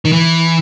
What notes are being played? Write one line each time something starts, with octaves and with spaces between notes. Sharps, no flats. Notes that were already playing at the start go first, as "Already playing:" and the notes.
D#3
E3